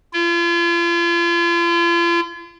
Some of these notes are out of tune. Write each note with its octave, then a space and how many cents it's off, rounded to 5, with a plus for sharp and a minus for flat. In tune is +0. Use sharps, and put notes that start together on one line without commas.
F4 -40